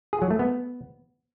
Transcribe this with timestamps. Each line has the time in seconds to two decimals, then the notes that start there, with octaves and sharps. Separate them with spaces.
0.13 G#4
0.22 F#3
0.31 A3
0.39 B3